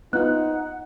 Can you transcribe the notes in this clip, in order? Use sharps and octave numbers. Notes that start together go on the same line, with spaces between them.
B3 D#4 F4 F#5 F#6